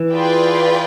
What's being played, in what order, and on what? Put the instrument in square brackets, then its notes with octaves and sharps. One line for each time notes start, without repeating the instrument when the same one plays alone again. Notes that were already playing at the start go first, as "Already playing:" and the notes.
Already playing: [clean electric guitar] E3
[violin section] F4 G#4 B4 D5 G5